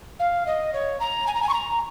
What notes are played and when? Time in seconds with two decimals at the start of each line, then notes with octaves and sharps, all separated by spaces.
0.19 F5
0.46 D#5
0.73 C#5
1.00 A#5
1.27 G#5
1.35 A#5
1.43 G#5
1.49 C#6
1.53 A#5